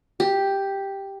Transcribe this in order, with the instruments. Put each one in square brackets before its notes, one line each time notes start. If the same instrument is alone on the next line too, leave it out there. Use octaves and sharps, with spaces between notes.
[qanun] G4